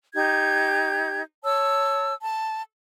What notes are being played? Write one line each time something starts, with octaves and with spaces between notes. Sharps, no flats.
D#4 G4 G6 G#6
C#5 A5 E6
A5